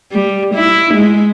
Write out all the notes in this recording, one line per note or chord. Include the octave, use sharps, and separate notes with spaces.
G3
E4
G#3